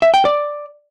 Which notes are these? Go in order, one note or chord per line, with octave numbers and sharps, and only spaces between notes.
E5
G5
D5